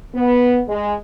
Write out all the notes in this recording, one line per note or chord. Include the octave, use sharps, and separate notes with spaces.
B3
G#3